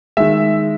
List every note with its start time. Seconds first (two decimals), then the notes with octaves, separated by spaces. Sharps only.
0.17 D#3 G#3 E5